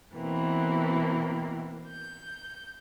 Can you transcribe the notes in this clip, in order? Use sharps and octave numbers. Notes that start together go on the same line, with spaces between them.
B2 E3 A#3 C4
G6